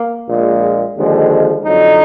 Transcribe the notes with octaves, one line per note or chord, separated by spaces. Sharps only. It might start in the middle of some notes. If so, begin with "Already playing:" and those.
Already playing: A#3
A#1 A#2 G#3
D#2 D3 F3 G#3
F2 D3 F#3 D#4